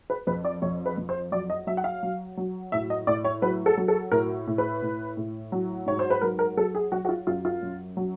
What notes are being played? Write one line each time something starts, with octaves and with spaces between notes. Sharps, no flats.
B4
F2 B4
D5
F2 C#5
B4
F2
C5
F#3 D5
D#5
F#3 E5
F#5
F5
F#3
F#3
A2 E5
D#5
A2 D5
C#5
F#3 B4
A4
F#3
A4
A2 A#4
A2
B4
A2
A2
F#3
G#2 C#5
C5
B4
F#3 A#4
A#4
F#3 A4
G#4
F#3 F#4
F#4
F4
F#2 F4
F4
F#2
F#3